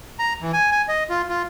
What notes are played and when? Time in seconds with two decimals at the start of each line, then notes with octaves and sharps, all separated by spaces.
0.19 A#5
0.42 E3
0.53 G#5
0.72 G#5
0.88 D#5
1.09 F4
1.29 F4